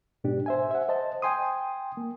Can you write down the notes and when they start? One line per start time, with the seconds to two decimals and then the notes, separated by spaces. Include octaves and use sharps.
0.24 G#2 B2 D4 G4
0.46 C5 E5 G#5
0.71 E5 F#5
0.88 C5 D#5 A5
1.22 G5 G#5 C6 D#6
1.97 A#3